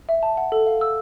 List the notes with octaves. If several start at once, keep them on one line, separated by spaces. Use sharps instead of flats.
E5
A5
F#5
A4
F5
E6